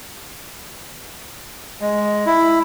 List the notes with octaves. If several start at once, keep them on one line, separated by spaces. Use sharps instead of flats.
G#3
E4